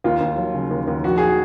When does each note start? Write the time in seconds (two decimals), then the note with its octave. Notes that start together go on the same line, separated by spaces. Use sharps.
0.04 D#2 F4
0.21 D#2
0.38 F#3
0.54 C#3
0.71 D#2
0.88 D#2
1.04 A#1 F#4
1.18 G#4